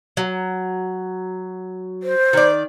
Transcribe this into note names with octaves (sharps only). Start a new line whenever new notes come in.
F#3
C5
D#3 D5